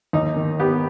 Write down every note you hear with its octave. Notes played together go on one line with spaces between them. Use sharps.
D#2 D#4
D#3
B3 G4